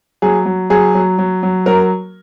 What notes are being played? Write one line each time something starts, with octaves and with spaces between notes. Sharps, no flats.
F#3 G#4
F#3
F#3 G#4
F#3
F#3
F#3
F#3 A#4